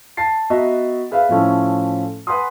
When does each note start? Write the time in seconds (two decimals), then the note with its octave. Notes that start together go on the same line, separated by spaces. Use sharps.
0.17 A5 A6 C7
0.50 B3 F#4 D#5 E5 A#5
1.11 G#4 B4 E5 F5
1.29 A2 F3 A3 C#4 E4
2.27 B4 F#5 G#5 A#5 C6 D#6